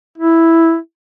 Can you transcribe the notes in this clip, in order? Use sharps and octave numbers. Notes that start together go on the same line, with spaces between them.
E4